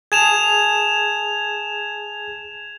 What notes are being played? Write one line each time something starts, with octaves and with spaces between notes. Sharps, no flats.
G#4 G#5 A5 G#6 E7 F7